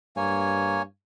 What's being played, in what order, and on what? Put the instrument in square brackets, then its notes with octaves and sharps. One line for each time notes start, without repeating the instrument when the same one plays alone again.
[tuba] G2 [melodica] A#3 C#5 G#5